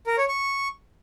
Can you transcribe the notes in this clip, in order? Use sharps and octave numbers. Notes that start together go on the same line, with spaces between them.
A#4
C#5
C#6